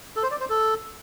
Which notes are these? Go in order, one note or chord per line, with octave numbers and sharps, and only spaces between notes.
A4
C5
D5
C5
A4